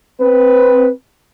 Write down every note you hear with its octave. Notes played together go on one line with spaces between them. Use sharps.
C4 B4